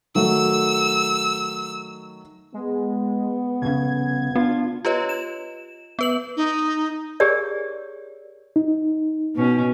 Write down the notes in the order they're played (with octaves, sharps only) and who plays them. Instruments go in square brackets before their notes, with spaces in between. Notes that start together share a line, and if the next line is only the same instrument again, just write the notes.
[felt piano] D#3 F#3 A3 [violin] E6
[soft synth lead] G#3 [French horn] B3
[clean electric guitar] C2 F2 C#3 [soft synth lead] G#6
[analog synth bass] B3 [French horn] D4 [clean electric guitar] F4
[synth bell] F4 G4 B4 C#5 D#5
E7
B3 B4 F#7
[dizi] D#4
[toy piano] G4 G#4 A#4 C#5 D5
[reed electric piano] D#4
[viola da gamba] B2 C#4